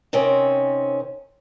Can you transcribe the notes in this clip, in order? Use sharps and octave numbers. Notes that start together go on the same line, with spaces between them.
C3 D#3 C4 C#4